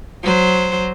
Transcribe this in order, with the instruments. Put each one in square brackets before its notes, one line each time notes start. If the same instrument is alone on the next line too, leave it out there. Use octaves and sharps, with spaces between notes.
[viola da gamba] F#3 C5